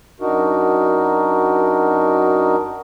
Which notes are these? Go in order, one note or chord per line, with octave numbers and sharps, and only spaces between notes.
F#2 D4 D#4 F#4 A#4